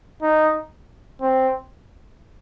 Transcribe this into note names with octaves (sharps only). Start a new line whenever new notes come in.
D#4
C4